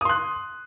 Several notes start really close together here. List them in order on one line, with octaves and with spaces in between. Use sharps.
D#6 C6 F#6